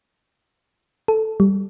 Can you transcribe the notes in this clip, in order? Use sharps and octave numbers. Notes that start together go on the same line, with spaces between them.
A4
G3